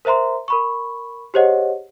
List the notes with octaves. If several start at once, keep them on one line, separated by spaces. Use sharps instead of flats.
A#4 C5 E5 A#5 C6
A#4 B5 C#6
G4 G#4 C5 C#5 D#5 F#5